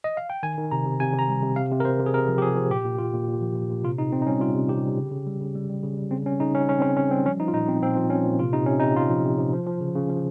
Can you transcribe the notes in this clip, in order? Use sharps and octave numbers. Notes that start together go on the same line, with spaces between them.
D#5
F5
G5
D#3 G#5
D#3
C3 A#5
C3
C3 G#5
C3 A#5
G3
C3
C3 F5
C3
A#4
C3 C5
C3
G#4
C3 A#4
F3
G4
F3 G#4
F3
A#2 G4
A#2
A#2 F4
A#2
A#2
F3
A#2
A#2
C3 F4
C3 D#4
C3 C4
D#4
G3 C#4
G3 F4
C3
C3 G4
G3
C#3
C#3
G3
C#3
G3
G3
C#3
G3
C#3 C4
G3 C#4
C#3 D#4
G3 C#4
G3 C#4
C4
C#3 C#4
C#3 C#4
G3 C4
F3 C#4
F3 D#4
F4
A#2 D#4
F3 C4
A#2 C4
F3
F3 C#4
A#2
C3 F4
C3 D#4
C3 C#4
D#4
C3
C3 F4
F3
C3
C3
F3
F3
C#3
C#3
F3